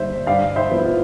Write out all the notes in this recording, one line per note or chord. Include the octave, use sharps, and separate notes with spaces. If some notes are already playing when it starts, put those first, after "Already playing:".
Already playing: G2 D3 G3 C5 E5
G2 D5 F5
C5 E5
F3 B3 E4
F4